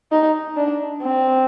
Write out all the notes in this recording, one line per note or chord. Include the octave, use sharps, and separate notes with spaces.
D#4
D4
C4